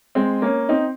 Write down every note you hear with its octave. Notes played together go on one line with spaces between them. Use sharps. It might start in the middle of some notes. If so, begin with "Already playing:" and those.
G#3 C4
A#3 C#4
C4 D#4